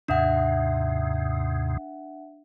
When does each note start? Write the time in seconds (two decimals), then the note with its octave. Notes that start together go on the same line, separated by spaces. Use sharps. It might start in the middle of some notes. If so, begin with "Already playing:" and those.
0.08 D#2 G#2 C3 D4 E5 F#5